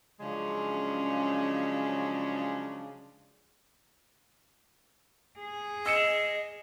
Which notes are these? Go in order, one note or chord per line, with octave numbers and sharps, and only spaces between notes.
C#3 F3 F#3 G#3 C#4 D4
G#4
D#5 E6 C#7 E7